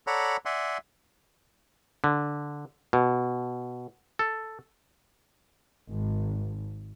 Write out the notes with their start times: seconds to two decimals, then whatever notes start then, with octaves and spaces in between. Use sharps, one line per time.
0.07 A4 C#5 D5 F#5 A#5 B5
0.45 D5 E5 F#5 G#5 C6
2.04 D3
2.93 B2
4.19 A4
5.90 G#1